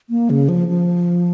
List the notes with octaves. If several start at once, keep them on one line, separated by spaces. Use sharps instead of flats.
A#3
C#3
F3
F3